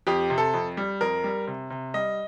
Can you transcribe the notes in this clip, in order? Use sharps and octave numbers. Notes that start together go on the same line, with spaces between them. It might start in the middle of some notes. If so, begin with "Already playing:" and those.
F2 G4
C3
A4
F2
G3
F2 A#4
G3
C3
C3
G3 D#5